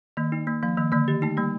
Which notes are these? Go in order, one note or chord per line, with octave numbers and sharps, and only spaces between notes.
D#3 A#3
D#4
A#3
F3 A#3
D#3 A#3
D3 A#3
D#3 G4
A3 D#4
G3 A#3